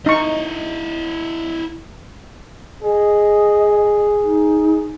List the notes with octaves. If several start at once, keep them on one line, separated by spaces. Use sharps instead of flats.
D#4 E4 D#5 C#6
G#4 D#5
D#4